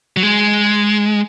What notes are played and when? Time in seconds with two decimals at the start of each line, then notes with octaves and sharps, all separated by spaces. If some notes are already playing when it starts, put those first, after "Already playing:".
0.17 F#3
0.23 G#3